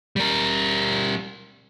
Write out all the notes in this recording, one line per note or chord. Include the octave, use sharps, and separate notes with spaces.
G3 A#4